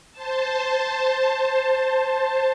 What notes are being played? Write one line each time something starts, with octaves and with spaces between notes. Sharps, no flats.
C5 A5